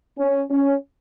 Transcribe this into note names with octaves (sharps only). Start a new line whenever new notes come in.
C#4
C#4